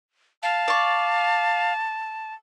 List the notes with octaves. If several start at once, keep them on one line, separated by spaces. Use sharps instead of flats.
F5 A5
D5 C#6